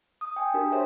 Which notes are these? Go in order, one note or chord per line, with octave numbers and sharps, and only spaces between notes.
D#6
G5 G#5 D#6
D4 F#4 G4 A#4
F#4 G#4 A#4 C5 C#5 E5